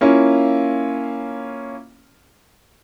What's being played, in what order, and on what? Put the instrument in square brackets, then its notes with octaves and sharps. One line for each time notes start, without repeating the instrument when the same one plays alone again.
[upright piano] A#3 C#4 E4 F4